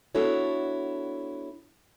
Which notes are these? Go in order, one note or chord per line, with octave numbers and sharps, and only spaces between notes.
B3 D4 E4 F#4 A4 C#5